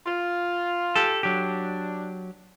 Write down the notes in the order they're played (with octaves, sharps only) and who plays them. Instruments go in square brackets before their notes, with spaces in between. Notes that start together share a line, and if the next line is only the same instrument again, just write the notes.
[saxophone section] F4
[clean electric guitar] G4 A4
[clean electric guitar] F#3 G4 [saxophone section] D4